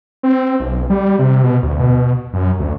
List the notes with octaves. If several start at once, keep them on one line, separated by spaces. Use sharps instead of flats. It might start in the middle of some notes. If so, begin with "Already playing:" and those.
C4
B1
G3
C3
B2
D2
B2
F#2
D2